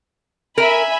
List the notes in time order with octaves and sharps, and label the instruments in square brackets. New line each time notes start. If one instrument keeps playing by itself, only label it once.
[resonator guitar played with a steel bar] A#4 [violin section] E5 G#5 B5